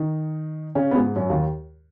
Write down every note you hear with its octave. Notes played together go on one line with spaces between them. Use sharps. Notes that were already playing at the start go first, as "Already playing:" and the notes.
Already playing: D#3 D#4
C#3 C#4
B3
G#2 G#3
F#2 F#3
D#2 D#3